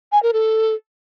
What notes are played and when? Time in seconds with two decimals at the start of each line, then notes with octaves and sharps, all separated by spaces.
0.12 G#5
0.23 A#4
0.33 A4